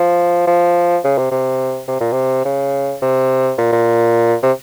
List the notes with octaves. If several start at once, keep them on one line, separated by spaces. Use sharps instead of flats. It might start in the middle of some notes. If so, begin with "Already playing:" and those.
Already playing: F3
F3
C#3
C3
C3
C3
A#2
C3
C#3
C3
A#2
A#2
C3